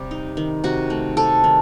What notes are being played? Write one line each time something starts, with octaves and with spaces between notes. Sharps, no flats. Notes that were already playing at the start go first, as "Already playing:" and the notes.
Already playing: C3 G3 G4
D#4
D#3
C3 F#4
A3
C3 A4
D#3